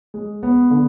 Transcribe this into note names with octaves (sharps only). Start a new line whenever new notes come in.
G#3
B3
D3